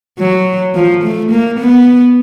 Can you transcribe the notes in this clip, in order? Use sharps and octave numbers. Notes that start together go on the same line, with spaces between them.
F#3
F3
A3
A#3
B3